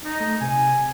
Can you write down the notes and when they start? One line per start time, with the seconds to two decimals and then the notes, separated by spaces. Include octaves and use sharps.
0.04 D#4
0.20 A3
0.41 C3 G#5